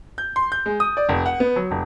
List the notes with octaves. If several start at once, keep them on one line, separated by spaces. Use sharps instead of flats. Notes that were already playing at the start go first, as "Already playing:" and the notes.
G6
C6
G6
G#3
D#6
D5
F1
F#5
B3
F#3
F1